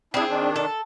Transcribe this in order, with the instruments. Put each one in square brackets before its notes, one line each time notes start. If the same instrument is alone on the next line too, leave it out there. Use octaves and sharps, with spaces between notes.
[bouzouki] C4 G#4 [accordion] D4 E4
[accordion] D#3 D4
[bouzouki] A4